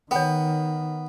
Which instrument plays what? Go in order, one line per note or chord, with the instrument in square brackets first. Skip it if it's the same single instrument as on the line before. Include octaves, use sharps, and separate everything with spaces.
[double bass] D#3 [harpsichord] B3 [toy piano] C#5 G5